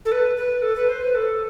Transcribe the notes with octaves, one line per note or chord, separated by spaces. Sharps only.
A4
B4
B4
A4
B4
C5
B4
A4